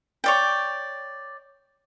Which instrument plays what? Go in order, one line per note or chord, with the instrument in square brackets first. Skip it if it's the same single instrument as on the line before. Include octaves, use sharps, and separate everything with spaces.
[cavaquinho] C#5 D5 G5